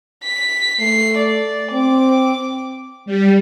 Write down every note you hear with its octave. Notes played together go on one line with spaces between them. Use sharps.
B6
A3 C7
D5
C4 D6
G3